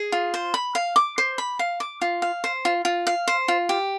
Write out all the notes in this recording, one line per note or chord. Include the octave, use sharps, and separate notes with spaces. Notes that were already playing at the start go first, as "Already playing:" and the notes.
Already playing: G#4
F4
C5
B5
F5
D6
C5
B5
F5
D6
F4
F5
C5
F4
F4
F5
C5
F4
G4